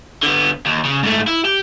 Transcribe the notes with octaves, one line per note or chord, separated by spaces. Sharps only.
D3 B3
D#2
C#3
G#2 A3
E4
G4